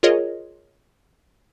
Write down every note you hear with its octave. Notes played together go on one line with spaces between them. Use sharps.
F4 G#4 A#4 C#5 D#5